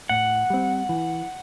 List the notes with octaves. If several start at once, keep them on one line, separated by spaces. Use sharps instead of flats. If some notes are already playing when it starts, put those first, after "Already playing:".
A2 F#5
G3 C4
E3